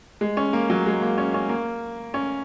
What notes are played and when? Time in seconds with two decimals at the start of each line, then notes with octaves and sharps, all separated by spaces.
0.21 G#3
0.37 C#4
0.53 A#3
0.70 F#3
0.86 G#3
1.02 A#3
1.18 C#4
1.34 C#4
1.49 A#3
2.14 C#4